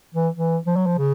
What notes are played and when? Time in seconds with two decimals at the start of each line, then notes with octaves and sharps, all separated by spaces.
0.14 E3
0.35 E3
0.66 F3
0.76 F#3
0.86 F3
0.98 C#3